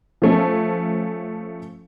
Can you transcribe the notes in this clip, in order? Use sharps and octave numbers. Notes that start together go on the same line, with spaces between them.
F3 A3 C#4